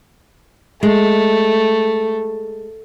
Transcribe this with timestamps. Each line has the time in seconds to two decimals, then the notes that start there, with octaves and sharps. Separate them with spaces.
0.83 G#3 A3